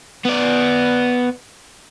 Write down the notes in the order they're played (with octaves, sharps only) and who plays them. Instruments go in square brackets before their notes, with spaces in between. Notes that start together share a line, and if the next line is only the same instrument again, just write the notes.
[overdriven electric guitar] B3 D5